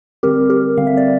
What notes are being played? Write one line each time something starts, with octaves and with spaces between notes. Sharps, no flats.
D3 G3 C4 G4 A#4
G4 A#4
D3 G3 C4 F5
E5
D5